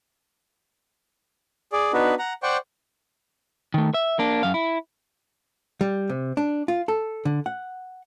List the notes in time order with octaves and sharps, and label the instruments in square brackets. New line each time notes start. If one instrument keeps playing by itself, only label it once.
[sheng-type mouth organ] G#4 D5
B3 D4 D#4 F#4 B4
F#5 A#5
C5 D5 F#5 G5 C#6
[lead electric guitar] D#3 A3
E5
A#3 D4
F#2 F5
E4
[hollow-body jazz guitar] G3
C3
D4
F4
A4
D3
F#5